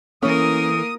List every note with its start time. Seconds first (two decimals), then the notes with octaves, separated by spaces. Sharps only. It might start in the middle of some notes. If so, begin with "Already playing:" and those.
0.23 E3 A3 A#3 C#4 A#4 D#6